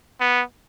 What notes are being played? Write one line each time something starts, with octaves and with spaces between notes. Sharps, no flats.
B3